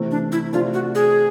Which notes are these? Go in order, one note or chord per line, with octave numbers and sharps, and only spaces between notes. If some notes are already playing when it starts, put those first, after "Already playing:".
Already playing: C3 E3 A3
D4
E4
C3 F3 A3 D4 F4
F#4
G#4